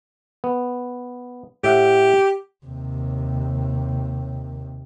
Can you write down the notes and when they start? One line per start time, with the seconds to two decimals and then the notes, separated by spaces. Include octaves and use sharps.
0.44 B3
1.64 A2 G4 E5 F#5
2.66 D#2 C3